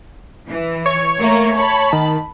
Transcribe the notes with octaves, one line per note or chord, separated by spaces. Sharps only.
E3
C#5
A3 A#3 A#4
A5 B5
D#3